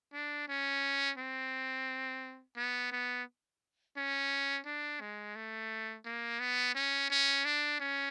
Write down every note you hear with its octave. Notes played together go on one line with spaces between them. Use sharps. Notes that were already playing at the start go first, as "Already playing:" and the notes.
D4
C#4
C4
B3
B3
C#4
D4
G#3
A3
A#3
B3
C#4
C#4
D4
C#4